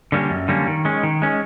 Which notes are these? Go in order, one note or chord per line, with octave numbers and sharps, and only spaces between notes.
D3 G3 A#3 C#4
F#2
D3 G3 A#3 C#4
D#3
G#3 C#4
D#3
G#3 C#4